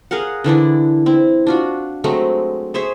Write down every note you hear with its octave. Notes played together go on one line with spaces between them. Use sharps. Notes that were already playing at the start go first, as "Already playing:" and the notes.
G#4 A#4 F5 F#5
D3 E3 D4 E4
C4 E4
D4 F4 F#4
F#3 G#3 A3 C4
G#4 C5 C#5 E5